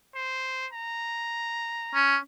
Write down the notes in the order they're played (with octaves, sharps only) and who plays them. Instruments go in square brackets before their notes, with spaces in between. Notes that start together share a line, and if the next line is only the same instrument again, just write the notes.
[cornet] C5
A#5
[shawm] C#4